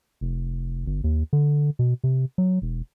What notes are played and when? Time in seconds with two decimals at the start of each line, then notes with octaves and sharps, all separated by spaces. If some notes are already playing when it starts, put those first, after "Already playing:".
0.21 F1
0.86 G1
1.04 D#2
1.33 D3
1.79 B2
2.04 C3
2.38 F#3
2.62 E1